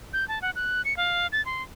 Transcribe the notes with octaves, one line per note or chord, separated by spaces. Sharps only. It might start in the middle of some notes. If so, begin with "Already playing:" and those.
G6
A5
F#5
F#6
C#7
F5
A6
C6